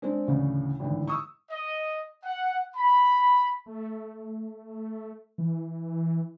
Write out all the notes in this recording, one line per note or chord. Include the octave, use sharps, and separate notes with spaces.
G#3 C4 D4
D2 A2 C#3 E3 C#4 D4
G#1 A2 D3 E3
C#6 D#6 E6
D#5
F#5
B5
A3
E3